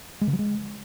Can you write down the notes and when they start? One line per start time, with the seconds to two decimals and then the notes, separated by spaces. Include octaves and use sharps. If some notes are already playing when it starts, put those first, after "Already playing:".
0.21 G#3
0.27 C#3
0.33 F#3
0.39 G#3